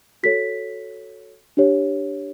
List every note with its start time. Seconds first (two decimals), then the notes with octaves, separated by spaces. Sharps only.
0.23 F#4 A4 C#5 B6
1.57 D4 G4 C#5